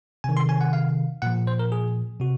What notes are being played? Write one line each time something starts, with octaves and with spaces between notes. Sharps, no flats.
C3 D#3 G#5
C6
G#5
F#5
F5
A#2 F3 F#5
C5
A#4
G#4
C3 F#4